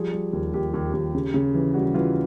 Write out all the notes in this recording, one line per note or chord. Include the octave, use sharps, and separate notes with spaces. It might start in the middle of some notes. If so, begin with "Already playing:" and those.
Already playing: F3 G3 G#4
G3
D#2
D#2 G4
D#2
D#2
C#3
C#3
E3
G3 F#4
E3 F4